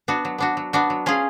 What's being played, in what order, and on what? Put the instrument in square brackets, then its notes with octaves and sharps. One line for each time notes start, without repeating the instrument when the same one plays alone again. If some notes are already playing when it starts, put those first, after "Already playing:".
[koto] B3 D4 F#4
F#3
B3 D4 F#4
F#3
B3 D4 F#4
F#3
C#4 F4 G#4